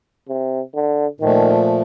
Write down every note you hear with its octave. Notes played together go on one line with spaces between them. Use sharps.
C3
D3
A#2 D#3 F3 A3